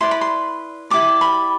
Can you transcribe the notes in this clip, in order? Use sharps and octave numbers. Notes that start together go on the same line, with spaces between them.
E4 B4 D5 C6
B5
C6
E4 G4 D5 D6
B5